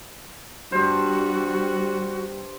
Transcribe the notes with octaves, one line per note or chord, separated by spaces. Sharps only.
G2 G3 F#4 C5